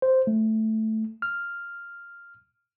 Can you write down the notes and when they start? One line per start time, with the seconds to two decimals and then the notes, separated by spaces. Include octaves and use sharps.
0.02 C5
0.27 A3
1.22 F6